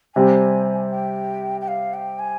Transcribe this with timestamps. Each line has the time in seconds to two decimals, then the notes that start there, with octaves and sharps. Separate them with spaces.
0.15 C3 G3 C4 G4 G#5
0.92 G5
1.61 G5
1.68 F5
1.94 G5
2.19 G#5